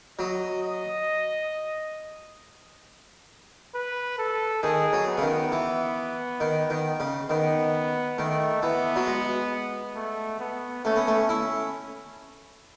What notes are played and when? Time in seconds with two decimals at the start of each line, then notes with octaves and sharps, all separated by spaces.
0.19 F#3 D#5
0.64 D#5
3.75 B4
4.19 A4
4.63 D#3 G#4
4.93 F#3
5.07 B3
5.18 C#3
5.22 D#3
5.52 E3
6.40 D#3
6.70 D#3
7.00 C#3
7.30 D#3 B3
8.18 D#3 A3
8.62 E3 B3
8.96 F#3
9.07 G#3
9.96 A3
10.40 B3
10.84 A3 C#4
10.96 B3
11.07 A3
11.29 C#4 E4